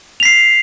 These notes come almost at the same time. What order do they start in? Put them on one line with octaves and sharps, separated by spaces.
F7 B6 C7